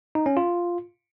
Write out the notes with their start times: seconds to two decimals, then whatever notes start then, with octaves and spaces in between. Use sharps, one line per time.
0.15 D#4
0.26 C#4
0.37 F4